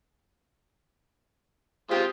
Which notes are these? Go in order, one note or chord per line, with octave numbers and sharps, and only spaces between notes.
G#3 C4 F4 G4